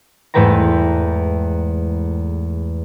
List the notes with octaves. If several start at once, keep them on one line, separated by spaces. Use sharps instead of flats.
E2 G#2 A3 B4 G5 A#5